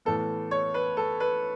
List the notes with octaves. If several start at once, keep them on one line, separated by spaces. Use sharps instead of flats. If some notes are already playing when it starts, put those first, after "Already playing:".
A2 E3 B3 A4
C#5
B4
A4
B4